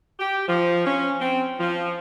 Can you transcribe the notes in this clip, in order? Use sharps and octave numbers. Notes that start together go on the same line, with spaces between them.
G4
F3
C#4
C4
F3